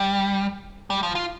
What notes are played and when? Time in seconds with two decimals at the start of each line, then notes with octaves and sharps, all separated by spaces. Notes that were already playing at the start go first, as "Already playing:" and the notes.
Already playing: G3
0.90 G3
1.03 F3
1.15 F4